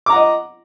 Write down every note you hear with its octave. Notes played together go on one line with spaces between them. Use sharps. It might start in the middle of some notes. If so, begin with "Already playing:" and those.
D#5 F#5 A#5 D6